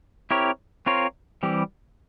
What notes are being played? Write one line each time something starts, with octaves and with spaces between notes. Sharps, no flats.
C4 E4 G4 A#4 C#5
C4 F4 A#4 C#5
E3 G3 C4 G4